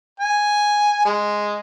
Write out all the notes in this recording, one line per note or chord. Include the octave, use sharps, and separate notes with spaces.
G#5
G#3